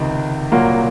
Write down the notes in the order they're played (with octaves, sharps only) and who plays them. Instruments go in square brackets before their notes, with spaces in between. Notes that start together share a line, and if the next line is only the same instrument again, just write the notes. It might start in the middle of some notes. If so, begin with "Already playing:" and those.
Already playing: [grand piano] C#2 C3 D#3
C2 A#2 F#3 A#3 F4